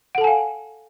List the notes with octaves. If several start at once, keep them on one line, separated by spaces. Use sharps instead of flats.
A4 F5 F#5 G#5 A5